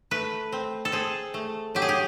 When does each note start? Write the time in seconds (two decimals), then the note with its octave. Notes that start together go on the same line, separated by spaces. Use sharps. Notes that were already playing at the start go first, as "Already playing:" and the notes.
0.11 A3 B4
0.52 C4
0.85 A4
0.92 C4 G#4
1.34 A3
1.75 F#3 G4
1.82 G#4
1.89 G4